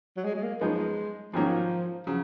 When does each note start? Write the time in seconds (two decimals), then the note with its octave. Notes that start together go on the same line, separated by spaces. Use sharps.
0.16 F#3
0.24 G#3
0.35 G#3
0.43 A#3
0.61 F#2 F3 G#3 B3 D#4
1.33 G#2 D#3 F3 F#3 A#3 C#4
2.07 C#3 F3 F#3